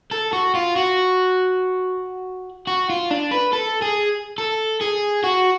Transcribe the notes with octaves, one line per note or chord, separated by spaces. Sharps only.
A4
F#4
F4
F#4
F#4
F4
D4
B4
A4
G#4
A4
G#4
F#4